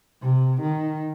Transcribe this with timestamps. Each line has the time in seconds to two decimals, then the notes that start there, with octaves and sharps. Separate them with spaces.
0.22 C3
0.61 D#3